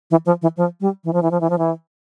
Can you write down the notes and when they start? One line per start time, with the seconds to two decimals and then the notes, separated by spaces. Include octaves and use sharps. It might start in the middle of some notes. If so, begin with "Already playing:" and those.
0.11 E3
0.26 F3
0.42 E3
0.57 F3
0.81 G3
1.04 E3
1.13 F3
1.23 E3
1.31 F3
1.41 E3
1.50 F3
1.58 E3